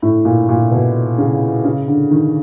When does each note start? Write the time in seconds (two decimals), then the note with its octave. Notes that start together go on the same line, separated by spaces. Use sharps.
0.02 A2
0.25 A#2
0.49 A#2
0.71 B2
1.18 C#3
1.64 C#3
1.88 D3
2.11 D#3